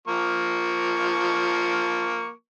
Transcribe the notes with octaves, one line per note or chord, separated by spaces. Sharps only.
F3 A#3 C#6